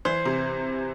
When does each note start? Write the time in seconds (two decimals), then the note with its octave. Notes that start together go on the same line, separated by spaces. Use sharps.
0.05 E3 C5
0.25 C3